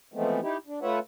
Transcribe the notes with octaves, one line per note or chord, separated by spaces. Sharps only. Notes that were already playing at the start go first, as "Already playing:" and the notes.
E3 F3 G#3 A3 B3 C4
D#4 E4 G4
D4
A3 F4 B4 C#5 E5 F#5